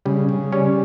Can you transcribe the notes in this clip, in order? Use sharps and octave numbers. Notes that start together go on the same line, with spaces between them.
C#3 G3
C#3
G3 C#4